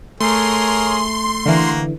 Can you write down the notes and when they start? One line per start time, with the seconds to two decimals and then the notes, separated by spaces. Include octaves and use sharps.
0.20 A3 G#4 A#4 C#5 C6
1.46 D3 E3 A#3 F#4 A#4